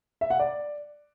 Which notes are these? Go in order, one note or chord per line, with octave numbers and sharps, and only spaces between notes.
E5
F#5
D5